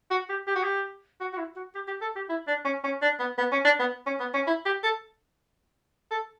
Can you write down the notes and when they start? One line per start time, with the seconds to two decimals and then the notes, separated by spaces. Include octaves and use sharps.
0.10 F#4
0.29 G4
0.47 G4
0.55 F#4
0.63 G4
1.20 F#4
1.33 F#4
1.37 E4
1.56 F#4
1.75 G4
1.88 G4
2.01 A4
2.16 G4
2.29 E4
2.47 D4
2.65 C#4
2.84 C#4
3.02 D4
3.19 B3
3.38 B3
3.52 C#4
3.65 D4
3.79 B3
4.06 C#4
4.20 B3
4.34 C#4
4.47 E4
4.65 G4
4.83 A4
6.11 A4